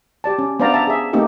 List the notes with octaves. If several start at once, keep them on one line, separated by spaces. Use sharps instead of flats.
G4 D5 A5
C#4
B3 D4 C5 D5 F5 A#5
E5 A5 A#5
G#4 E5
A3 A#3 C4 D#4 G4 A4